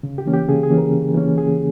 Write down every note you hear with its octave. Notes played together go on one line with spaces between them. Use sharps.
C#3
G4
E3 A#3 C#4
G4
C#3 G#4
G#4
E3 A#3 C#4
A#4
C#3
E3 A#3 C#4
C#3 G#4